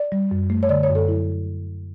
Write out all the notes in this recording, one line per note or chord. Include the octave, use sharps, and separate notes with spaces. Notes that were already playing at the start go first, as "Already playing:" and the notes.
Already playing: D5
G3
F#2
A3
C#5
D3 D5
C#5
F#2
A4
F#3 E4